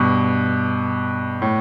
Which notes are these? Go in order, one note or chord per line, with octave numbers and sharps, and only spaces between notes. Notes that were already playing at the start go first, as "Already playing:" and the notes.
Already playing: G2 B2
A2